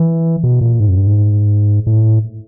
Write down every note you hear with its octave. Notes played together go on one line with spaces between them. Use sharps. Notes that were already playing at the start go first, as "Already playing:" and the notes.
Already playing: E3
B2
A#2
G#2
F#2
G2
G#2
A2